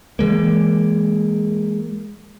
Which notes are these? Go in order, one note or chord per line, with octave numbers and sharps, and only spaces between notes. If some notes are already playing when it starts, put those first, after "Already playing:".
E3 G#3 A#3